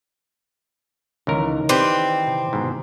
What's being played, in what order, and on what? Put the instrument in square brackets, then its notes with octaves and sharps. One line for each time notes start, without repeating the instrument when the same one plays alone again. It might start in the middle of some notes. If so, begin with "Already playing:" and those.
[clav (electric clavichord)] C#2 A#4 [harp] D#3 E3
[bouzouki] C4 [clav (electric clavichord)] G4 B4 D5
[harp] C3
[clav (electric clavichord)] G#2 B2